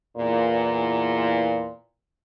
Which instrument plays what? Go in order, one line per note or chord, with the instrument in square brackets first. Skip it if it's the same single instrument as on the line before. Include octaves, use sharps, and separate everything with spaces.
[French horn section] E2 A#2